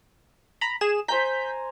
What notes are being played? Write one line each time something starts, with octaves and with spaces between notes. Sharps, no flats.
A#5 B5
G#4 E7
C5 G#5 A#5 G6 B6